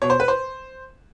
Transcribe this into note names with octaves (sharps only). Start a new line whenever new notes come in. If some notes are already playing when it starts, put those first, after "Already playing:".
B2 C#5
C5
B4
C5